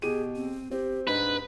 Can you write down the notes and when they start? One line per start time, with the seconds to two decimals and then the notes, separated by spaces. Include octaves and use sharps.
0.02 B2 G4 G#4 D#7
0.35 C4
0.71 C4 G4
1.07 G#2 D4 B4